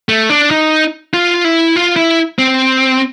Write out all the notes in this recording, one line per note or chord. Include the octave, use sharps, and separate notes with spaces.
A3
D4
D#4
F4
E4
F4
E4
C4